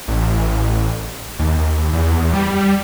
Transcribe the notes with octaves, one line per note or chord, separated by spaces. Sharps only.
A1
D#2
E2
G3